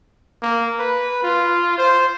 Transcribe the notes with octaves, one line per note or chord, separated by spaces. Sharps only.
A#3
B4
F4
C5